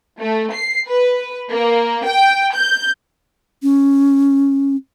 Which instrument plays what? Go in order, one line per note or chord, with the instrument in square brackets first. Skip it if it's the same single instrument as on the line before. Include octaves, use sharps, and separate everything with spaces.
[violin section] A3
C7
B4
A#3
G5
G6
[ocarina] C#4